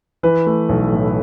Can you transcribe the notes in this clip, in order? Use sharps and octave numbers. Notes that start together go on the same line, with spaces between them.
E3 B4
A3
B1
A2